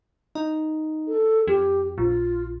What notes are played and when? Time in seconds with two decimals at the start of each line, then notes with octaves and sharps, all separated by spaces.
0.35 D#4
1.08 A4
1.47 F2 G4
1.98 A#1 F4